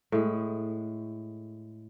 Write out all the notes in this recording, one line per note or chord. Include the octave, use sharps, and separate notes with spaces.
A2 G#3